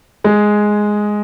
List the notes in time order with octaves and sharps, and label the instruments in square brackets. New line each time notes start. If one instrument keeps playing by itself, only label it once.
[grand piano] G#3 G#4